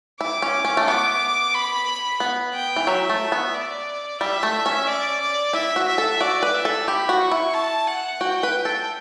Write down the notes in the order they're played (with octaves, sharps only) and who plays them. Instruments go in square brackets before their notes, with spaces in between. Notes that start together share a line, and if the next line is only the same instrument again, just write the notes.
[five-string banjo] E4 [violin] D6
[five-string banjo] C#4
C#4
A3
[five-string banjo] B3 [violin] D6
[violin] B5
[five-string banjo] B3
[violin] G5
[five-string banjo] E3
[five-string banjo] F#3 [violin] E5
[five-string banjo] A3
B3
[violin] D5
[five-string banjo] G3 [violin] E5
[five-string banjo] A3
C#4
[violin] D5
D5
[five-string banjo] E4 [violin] E5
[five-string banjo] F#4
[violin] E5
[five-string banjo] A4
[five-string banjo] F#4 [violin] D5
[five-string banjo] B4
[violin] E5
[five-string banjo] A4
[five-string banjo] G4 [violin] B5
[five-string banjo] F#4
[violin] C#6
[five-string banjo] E4
[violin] A5
F#5
[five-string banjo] F#4 [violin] G5
[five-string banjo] B4
A4